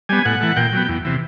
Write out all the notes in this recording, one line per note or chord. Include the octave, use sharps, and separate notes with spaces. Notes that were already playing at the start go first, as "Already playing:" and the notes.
G3 B3 G#5
A2 F#5
E3 A3
A#2 G5
F#3 B3
E2
C3 E3